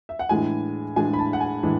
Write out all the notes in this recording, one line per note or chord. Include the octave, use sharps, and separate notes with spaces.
E5
F#5
A2 E3 G#3 D4 G#5
A2 E3 G#3 D4 G#5
B5
A5
F#5
G#5
A2 E3 G#3 D4